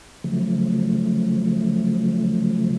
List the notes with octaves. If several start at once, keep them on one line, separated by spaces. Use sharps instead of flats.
C#3 F3 F#3 A3